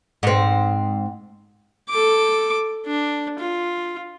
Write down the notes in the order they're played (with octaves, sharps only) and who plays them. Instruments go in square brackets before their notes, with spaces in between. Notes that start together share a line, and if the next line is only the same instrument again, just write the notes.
[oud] G#2 C4
[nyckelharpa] A4 D6
D4
F4